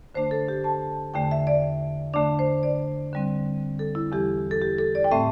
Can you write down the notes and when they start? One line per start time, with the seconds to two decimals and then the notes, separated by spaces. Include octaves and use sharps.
0.15 D3 A3 D4 C5
0.31 A4
0.49 G4
0.64 A5
1.14 E2 D3 A3 G5
1.31 E5
1.47 D5
2.13 D3 A3 D4 D5
2.39 C5
2.63 D5
3.13 D3 G3 C4
3.79 A4
3.95 E4
4.12 E2 E3 G3 G4
4.51 A4
4.62 G4
4.78 A4
4.95 D5
5.04 G5
5.11 A2 A3 C4 E5